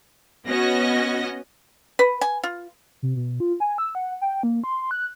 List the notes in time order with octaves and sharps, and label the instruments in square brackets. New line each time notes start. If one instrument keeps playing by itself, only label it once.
[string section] B3 C#4 F#4 D#5 A#6
[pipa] B4
G#5
F4
[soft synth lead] C3
B2
F4
G#5
E6
F#5
G5
A#3
C6
F#6